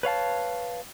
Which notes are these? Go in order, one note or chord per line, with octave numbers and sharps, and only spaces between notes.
B4 C#5 F5 A5